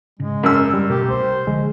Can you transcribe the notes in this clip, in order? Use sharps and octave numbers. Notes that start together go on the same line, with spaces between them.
G#2 C#3 G#3
F#2 E6
G3
B2 A3 G4 A#4
C2 C5
D3 F3 G#3